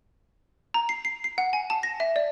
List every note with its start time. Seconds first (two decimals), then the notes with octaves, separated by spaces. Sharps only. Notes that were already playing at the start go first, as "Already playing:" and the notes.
0.74 A#5
0.89 C7
1.05 C7
1.24 C7
1.38 F#5
1.53 G#5
1.70 A5
1.83 A#6
2.00 E5
2.16 D5